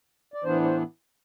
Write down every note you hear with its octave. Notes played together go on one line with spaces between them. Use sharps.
D5
A2 E3 B3 D4 C5
C5